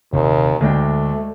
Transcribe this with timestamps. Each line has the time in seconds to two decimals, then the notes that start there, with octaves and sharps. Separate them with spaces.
0.13 D#1 D#2 C3
0.61 D2 G#3 A3 D4 G5